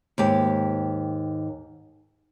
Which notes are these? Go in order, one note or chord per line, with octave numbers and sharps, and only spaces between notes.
D#2 G#2 G4